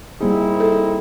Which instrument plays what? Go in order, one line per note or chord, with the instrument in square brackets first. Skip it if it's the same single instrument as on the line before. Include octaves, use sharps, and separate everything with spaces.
[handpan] G3 A#3 G#4 [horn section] C4 D#4 E4
[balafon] A4